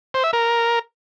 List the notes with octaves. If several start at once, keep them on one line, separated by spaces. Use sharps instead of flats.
C5
E5
A#4